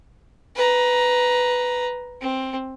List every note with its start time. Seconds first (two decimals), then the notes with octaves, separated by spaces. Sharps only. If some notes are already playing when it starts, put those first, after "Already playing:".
0.56 B4 A#5
2.21 C4